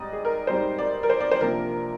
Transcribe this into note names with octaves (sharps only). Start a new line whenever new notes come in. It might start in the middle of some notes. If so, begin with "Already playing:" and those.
Already playing: G#2 G3 C4 D5 D#5
G#4
A#4
G#2 G3 C4 D#4 C5
D5
A#4
C5
D5
C5
C3 F3 A#3 D4 A#4